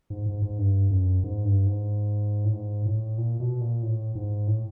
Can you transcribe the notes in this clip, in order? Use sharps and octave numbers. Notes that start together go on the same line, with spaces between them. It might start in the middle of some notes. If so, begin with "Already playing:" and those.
G#2
G#2
G#2
G2
F#2
G#2
G2
G#2
A2
G#2
A2
A#2
B2
A#2
A2
G#2
A2